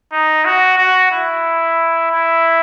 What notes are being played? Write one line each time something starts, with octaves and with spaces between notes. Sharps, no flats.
D#4
F#4
F#4
E4
E4